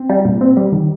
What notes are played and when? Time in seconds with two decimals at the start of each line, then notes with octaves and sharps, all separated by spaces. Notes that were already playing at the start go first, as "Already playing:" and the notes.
Already playing: C4
0.09 G3
0.25 A#2
0.41 C4
0.57 G3
0.72 D#3